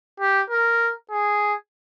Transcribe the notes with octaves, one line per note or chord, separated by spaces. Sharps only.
G4
A#4
G#4